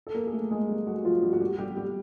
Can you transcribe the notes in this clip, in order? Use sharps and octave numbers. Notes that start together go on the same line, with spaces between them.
A4
A#3 A#4
G#4
A3 A4
G#3 G#4
G3 G4
F#3 F#4
F3 F4
G3 G4
F#4
G3 G4
G3 G4
G3 G4